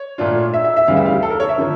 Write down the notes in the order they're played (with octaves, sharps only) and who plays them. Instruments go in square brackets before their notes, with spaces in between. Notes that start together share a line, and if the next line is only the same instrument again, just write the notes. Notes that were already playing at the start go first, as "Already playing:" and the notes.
Already playing: [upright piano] C#5
[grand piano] A#2 A3 D4 F4
[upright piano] E5
E5
E5
[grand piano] D2 C#3 E3 G3 [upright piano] F5
[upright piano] E5
F5
G4
A4
A#4
C#5
E5
[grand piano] D3 F3 A#3